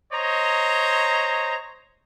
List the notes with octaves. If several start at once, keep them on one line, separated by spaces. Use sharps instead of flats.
C5 C#5 D#5 A#5